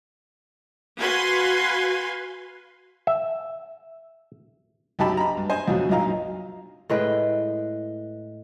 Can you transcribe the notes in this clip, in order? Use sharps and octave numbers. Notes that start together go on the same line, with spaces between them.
F#4 B4 F5 G#5 C6
E5
B1 F#2 D#4 G4 A5 B5
A#5 B5
G2
C5 D#5 G#5
F2 B2 F#3
B1 F#2 A#2 D#4 F5 A#5
A2 G#3 B4 G5